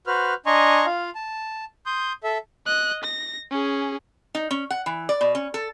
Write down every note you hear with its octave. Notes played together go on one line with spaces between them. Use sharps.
F#4 B4 C5 F6
D4 D#5 G#5 A#5 C6 C#6
F4 F5
A5
C6 D#6 G6
A4 E5
D#5 F#6
A#6
C#4 G#4
D#4
C#4
F#5
E3
D5
B2
C#4
A4